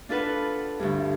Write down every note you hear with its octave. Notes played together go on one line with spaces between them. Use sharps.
D4 F4 A4 B4 F#5
D2 G2